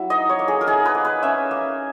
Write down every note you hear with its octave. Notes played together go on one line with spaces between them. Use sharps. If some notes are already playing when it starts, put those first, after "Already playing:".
Already playing: F#3 A#3 E4
D#4 D#5
C#5
A#3
G#4
A#4
D#4 G#4
B4
A#3
B4
C#4 E5
A#3